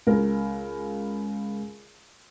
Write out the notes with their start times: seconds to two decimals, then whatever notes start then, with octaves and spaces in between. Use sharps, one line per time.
0.07 C#2 A#4